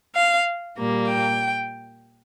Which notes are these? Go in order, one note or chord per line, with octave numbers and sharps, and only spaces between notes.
F5
A#2 G3 A#3
G5